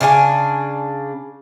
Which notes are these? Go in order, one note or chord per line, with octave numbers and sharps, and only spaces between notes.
C#3 D4 A4 G#5